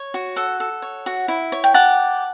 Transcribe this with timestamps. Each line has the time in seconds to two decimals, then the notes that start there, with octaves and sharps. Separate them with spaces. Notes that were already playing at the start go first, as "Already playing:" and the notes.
Already playing: C#5
0.14 F#4
0.36 A4 F#5
0.60 A4
0.82 C#5
1.06 F#4
1.28 E4
1.52 C#5
1.64 G5
1.74 G4 F#5 A5